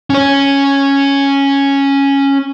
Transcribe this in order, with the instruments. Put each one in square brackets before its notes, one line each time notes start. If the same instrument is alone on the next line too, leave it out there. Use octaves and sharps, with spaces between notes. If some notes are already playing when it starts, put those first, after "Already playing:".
[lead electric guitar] C#4 C#5